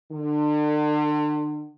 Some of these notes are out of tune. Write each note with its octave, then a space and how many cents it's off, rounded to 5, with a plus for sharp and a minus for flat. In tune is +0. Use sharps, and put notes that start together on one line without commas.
D3 +35